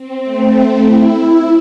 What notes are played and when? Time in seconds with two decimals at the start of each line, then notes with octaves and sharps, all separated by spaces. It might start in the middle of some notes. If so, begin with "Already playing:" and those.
Already playing: C4
0.23 A3
0.79 E4